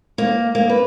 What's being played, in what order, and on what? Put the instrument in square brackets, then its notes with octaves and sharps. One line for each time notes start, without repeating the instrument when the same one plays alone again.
[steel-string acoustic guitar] A#3
A#3
B4